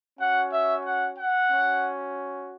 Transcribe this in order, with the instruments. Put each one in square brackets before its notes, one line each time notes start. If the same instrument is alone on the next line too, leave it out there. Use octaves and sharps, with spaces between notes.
[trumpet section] C#4 F#4 F#5
E5
F#5
F#5
C#4 F#4